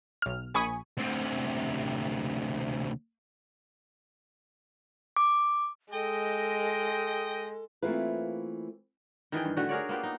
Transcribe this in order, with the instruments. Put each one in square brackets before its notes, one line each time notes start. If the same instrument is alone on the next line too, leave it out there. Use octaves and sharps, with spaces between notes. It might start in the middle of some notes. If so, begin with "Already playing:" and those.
[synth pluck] B1 F6
A#1 G#5 B5 C#6 D#6
[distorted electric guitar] D2 C3
[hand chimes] D6
[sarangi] G#3 [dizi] A4 [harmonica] D#5 G5
[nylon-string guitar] E3 A3 A#3 C4 F4 B4
[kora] D#3 E3 G#4 G5
G2
D3 A3 F#4
G#4 A#4 C#5 D5
A#3 B3 F4 G4
D#4